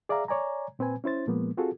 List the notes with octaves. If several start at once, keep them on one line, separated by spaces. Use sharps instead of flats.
G#4 D5 E5 F5 A#5
C#5 D5 G#5 A#5
A#2 C4 B4 G#5
C#4 E4 C5 A6
A#2 F3 G#3 A#3 B3
C4 F4 F#4 G#4 A4